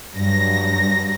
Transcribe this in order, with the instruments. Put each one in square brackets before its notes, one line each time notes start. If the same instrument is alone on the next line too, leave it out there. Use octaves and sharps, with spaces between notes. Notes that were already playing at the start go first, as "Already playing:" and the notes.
[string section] G2 F#3 A#6